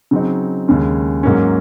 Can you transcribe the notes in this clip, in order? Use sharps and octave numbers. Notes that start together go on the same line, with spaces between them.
C#3 F#3 C4 D#4
D#2 C#3 G#3 C#4
G#2 F#3 A#3 C#4